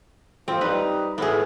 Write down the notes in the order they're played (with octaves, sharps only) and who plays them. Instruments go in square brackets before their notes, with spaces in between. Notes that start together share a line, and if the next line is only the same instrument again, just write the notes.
[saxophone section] F3 [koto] C4
[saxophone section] G3 D#4 [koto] B4
[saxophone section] A2 [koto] B3 G#4